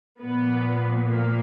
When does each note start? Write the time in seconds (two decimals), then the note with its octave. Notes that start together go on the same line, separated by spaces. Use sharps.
0.20 A#2 F3 B3
1.11 A#3